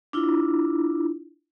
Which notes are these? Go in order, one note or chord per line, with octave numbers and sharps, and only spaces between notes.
D4 E4 F4